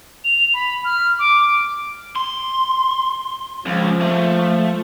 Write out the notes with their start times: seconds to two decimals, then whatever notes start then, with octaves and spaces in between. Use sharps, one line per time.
0.24 F7
0.54 B5
0.84 F6
1.19 D6
2.16 C6
3.66 C#2 F3
4.01 A3